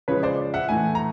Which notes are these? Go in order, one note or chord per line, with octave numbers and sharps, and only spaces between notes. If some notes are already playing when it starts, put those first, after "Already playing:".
C#3 F3 G#3 B4 C#5
C5 D5
E5 F#5
A2 E3 A3 F#5 G#5
A#5